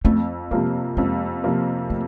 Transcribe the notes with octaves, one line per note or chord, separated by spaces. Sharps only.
F2 A3
C3 F3 G#3 A#3
F2 G#3
C3 F3 A#3
A3